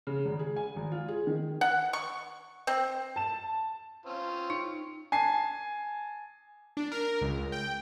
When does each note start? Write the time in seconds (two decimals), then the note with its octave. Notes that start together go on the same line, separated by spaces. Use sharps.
0.07 C#3
0.26 G#1
0.39 G#4
0.56 G#5
0.76 G#1
0.92 F4
1.08 G#4
1.27 D#3
1.61 F#5
1.93 C#6
2.67 C4
3.16 A5 E7
4.06 C4 C#4 F4
4.50 D#4
5.12 G#5 A5 C7
6.77 D4
6.92 A#4
7.21 C#2
7.52 G5